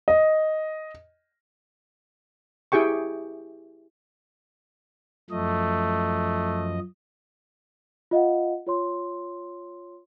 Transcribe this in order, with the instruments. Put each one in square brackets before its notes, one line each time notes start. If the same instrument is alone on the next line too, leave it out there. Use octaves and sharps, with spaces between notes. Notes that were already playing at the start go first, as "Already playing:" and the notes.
[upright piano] D#5
[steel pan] E4 G4 G#4 G5 C#6
[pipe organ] F#2 F3 D#5 [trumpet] A3
[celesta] F4 D#5 F5 F#5
F4 C#5 C6